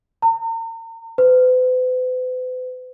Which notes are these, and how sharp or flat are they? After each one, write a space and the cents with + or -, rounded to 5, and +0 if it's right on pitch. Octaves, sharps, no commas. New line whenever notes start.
A#5 -40
B4 +45